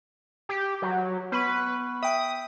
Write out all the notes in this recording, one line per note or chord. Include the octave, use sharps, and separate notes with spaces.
G4
F#3
B3 B4 B5 C#6
E5 G5 D#6